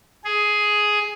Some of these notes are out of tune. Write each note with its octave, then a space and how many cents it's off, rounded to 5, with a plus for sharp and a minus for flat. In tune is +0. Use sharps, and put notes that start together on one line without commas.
G#4 +10